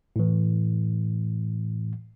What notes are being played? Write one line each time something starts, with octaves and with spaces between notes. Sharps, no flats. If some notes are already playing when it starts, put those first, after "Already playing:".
A2 E3